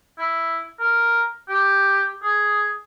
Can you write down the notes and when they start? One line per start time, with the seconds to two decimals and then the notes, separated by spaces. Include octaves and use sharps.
0.19 E4
0.79 A#4
1.49 G4
2.23 G#4